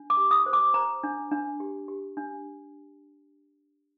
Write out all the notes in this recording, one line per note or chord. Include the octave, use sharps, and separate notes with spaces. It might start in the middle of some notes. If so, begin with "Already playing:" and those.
Already playing: D4
D6
G4
D#6
C5
D6
C5 A#5
D4
D4
G4
G4
D4